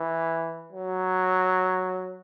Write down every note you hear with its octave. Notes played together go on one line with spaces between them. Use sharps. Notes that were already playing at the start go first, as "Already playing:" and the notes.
Already playing: E3
F#3